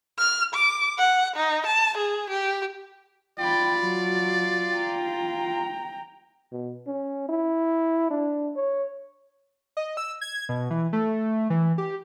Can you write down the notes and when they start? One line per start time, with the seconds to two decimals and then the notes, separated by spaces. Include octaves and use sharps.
0.19 F6
0.54 D6
0.98 F#5
1.36 D#4
1.66 A5
1.97 G#4
2.30 G4
3.39 F4 D5 G5 B5
3.81 F#3
4.75 G5 A#5
6.52 B2
6.87 C#4
7.29 E4
8.11 D4
8.56 C#5
9.77 D#5
9.97 E6
10.21 G#6
10.49 B2
10.70 E3
10.93 A3
11.50 E3
11.78 G4